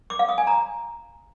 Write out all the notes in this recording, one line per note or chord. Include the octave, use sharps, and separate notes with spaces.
D6
F5
D#6
G#5
A#5